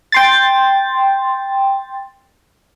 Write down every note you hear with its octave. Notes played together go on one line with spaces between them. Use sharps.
G5 C6 A6